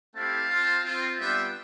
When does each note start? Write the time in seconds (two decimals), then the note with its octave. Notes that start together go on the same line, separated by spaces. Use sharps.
0.15 A3 C4 E4 G4 F5 A5
0.50 C4 F4
0.84 C4 F4
1.18 G3 B3 D4 F4 E5 G5